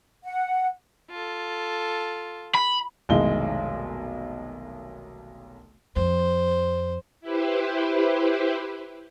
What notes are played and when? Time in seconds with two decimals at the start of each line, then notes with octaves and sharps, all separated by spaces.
0.24 F#5
1.10 F4 A4
2.54 B5
3.09 F1 B1 D#3 G#3 E4 G7
5.96 F2 C5
7.21 E4 G4 B4 C5